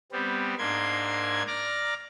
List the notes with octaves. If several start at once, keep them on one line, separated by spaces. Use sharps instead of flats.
G3 B3 C4
G#2 A#3 D4 C6 G#6
D5 A#5 D6 F6